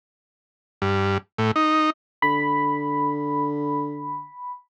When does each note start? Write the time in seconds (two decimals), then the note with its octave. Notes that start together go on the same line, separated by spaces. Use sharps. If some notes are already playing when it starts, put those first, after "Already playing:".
0.82 G2
1.38 A2
1.56 D#4
2.22 D3 B5